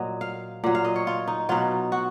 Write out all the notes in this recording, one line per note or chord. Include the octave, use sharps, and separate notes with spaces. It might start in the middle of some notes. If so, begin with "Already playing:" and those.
Already playing: A#2 F#3 D#5
F5
A#2 F#3
F5
D#5
C#5
F4
D#4
B2 F#3 F4
F#4